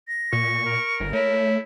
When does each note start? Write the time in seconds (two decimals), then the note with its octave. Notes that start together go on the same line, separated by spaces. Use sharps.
0.08 A#6
0.33 A#2 C#6
0.65 A#4
1.00 G1
1.13 A3 E4 C#5